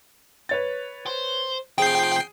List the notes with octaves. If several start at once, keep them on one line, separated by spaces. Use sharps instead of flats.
B4 C#5 A6
C5
C3 F3 G#4 G5 C7